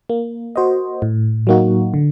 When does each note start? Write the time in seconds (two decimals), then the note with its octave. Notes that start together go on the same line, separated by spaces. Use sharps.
0.09 A#3
0.56 F#4 C5 D#5
1.02 A2
1.47 F#3 A#3 D#4 F#4
1.94 D3